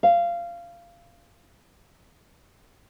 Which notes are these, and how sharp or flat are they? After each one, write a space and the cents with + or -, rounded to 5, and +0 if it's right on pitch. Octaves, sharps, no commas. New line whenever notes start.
F5 -20